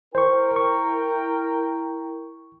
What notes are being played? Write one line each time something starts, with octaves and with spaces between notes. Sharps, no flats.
E4 A#4 C5 G5 C#6
C#6